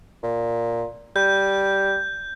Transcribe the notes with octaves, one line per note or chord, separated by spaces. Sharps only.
A#2
G3 G6